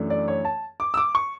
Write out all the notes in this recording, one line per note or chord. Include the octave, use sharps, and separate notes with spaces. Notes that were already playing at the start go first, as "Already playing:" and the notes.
Already playing: F#2 E3 A3 D4
D5
C#5
A5
D6
E6
D6
C#6